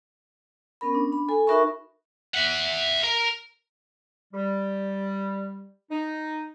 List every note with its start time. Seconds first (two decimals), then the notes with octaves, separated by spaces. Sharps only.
0.81 B3 C#4 A#4 B5
0.94 D4
1.12 D4 B5
1.29 A4 G#5
1.47 D#4 F#4 A#4 E5 B5 C#6
2.34 E5 F#5
3.04 A#4
4.34 G3
5.91 D#4